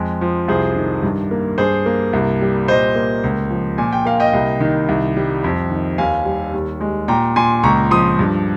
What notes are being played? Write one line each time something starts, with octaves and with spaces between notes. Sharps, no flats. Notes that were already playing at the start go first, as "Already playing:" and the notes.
Already playing: F2 G#3
F3
C2 G#4 C5
D#3
G2
A#3
G2 G#4 C5
A#3
C2
G3
A#2 C5 D#5
A#3
C#2
F3
A#2 G#5
G5
A#3 F5
D#5 G5
C2
D#3
C2
G3
F2
D#3
D#2 F5 G#5
G3
D#2
G#3
A#2 G5 A#5
A#2 G#5 C6
C#2 A#5 C#6
F3 C6 D#6
G2